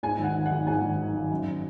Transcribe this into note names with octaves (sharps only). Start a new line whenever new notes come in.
G#2 G#5
G#1 F#5
D#3
F#5
G#1
G#2 G#5
G#1
D#3
G#1
F#2